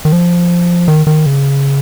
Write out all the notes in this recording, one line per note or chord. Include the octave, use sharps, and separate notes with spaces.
D#3
F3
D#3
D#3
C#3